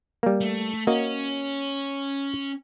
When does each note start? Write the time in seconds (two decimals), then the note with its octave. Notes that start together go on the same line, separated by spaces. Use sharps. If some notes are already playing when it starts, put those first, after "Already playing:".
0.23 G3 A#3
0.41 A3
0.87 A#3 C#4 F#4 D#5